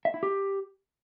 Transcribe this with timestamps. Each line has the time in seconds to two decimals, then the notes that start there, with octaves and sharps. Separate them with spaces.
0.05 E5
0.14 E4
0.23 G4